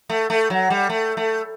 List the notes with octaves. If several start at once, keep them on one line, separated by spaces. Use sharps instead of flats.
A3
A3
F#3
G3
A3
A3